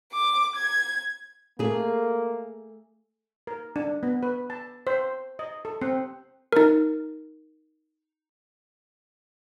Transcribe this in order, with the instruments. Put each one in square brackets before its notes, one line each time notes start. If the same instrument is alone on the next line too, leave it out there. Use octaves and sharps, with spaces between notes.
[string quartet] D6
G#6
[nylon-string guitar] A3 G#4 [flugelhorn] A#3
[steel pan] A#4
D4
B3
B4
A5
C5
D#5
A4
C4
[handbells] D#4 A#4